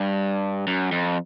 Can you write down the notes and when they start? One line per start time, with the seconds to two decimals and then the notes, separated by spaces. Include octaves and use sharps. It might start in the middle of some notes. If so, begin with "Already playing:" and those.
Already playing: G2
0.67 F#2
0.92 F2